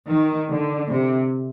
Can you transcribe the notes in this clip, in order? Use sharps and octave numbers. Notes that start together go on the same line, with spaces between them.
D#3
D3
C3